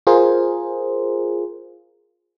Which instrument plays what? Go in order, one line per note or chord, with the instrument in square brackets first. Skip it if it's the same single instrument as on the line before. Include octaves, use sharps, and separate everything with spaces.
[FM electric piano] F4 G#4 A#4 C5